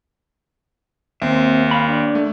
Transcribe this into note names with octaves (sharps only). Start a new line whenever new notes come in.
D#2 C4 E5
F5 B5
D4
A3